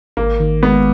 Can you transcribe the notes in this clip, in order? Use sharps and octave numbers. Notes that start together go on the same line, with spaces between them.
G#1 A#3
D#3
G#3 B3